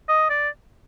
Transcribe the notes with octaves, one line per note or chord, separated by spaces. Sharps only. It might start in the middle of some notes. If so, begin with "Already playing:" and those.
D#5
D5